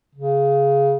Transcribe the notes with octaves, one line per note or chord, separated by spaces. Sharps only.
C#3